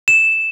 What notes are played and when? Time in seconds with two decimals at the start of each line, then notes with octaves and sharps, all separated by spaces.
0.08 E7